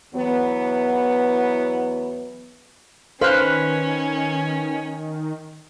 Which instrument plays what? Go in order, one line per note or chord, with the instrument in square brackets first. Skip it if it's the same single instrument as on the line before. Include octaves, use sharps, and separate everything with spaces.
[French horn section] E2 E3 F#3 B3
[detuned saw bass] D#3 [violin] C#4 [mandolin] B4 F#6 [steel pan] C5 F5